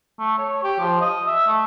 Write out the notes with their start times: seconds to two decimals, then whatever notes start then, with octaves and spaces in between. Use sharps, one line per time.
0.19 A3
0.38 C#5
0.63 G4
0.80 F3
1.01 D#5
1.27 E5
1.47 A3